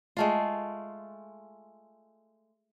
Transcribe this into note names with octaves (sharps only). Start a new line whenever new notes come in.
G#3 A3 F4